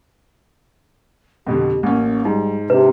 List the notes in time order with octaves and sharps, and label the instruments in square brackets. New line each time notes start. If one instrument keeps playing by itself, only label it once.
[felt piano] F2 B2 D3 [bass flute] G4
[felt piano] A1 C#4 [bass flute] A#3
[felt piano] G#2 [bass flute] G3 [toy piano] D#4
[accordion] C3 [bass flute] D4 [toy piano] B4